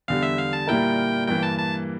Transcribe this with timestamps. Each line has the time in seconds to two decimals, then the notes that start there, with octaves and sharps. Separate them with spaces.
0.08 E2 D3 G3 F5
0.23 E5
0.38 F5
0.53 A5
0.68 A#2 G3 A#3 E4 A#4 G5
1.27 G2 E3 A#3 G5
1.43 A5
1.59 A5